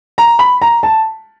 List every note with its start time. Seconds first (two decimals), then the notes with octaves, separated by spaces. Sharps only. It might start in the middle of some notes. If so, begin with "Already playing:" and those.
0.18 A#5
0.39 B5
0.62 A#5
0.83 A5